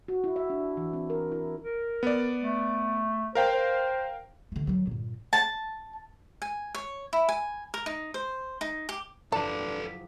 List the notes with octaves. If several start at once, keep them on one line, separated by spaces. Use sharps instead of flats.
F#4
E4
E5
D4
E3
C4
A#4
E4
A#4
B3 D5
A3
A#4 C5 F5 G5
C5
D3 A3
D#3 F#3
G2 A#2
A5
G#5
C#5
E4
G#5
A#4
D#4
C5
D#4
G4
F#1 F3 D4 A4 B4 A5 D6